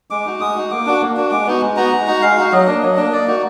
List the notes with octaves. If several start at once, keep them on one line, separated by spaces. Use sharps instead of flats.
G#3 D6
D#4 F#4
G#3 D#6
D#4 F#4
A#3 D6
D4 F#4
A#3
D4 F#4
G#3 D6
B3 D#4 F#4
G#3
B3 D#4 F#4 A#5
G#3
D#4 F#4
G#3 F5
D#4 F#4
F#3 D#5
A#3 D4
F#3 D#5
A#3 D4
A#3 D5
D#4 F#4